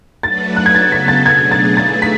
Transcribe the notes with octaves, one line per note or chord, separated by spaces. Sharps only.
F#3 A3 D4 F#4 B4 A6
F#6
G#6
C#3 F#3 B3 F#4 A4 A6
B6
A6
B2 F#3 A3 D4 G#4 G#6
A6
D3 A3 E4 G#4 B4 A6
B6